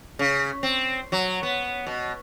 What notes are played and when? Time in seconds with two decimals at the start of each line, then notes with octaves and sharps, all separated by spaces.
0.19 C#3
0.63 C4
1.12 F#3
1.43 B3
1.87 B2